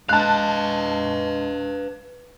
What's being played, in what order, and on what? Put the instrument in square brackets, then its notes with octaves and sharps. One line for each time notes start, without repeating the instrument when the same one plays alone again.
[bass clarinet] G#3 [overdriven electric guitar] B4 F5 [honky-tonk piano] A5 F#6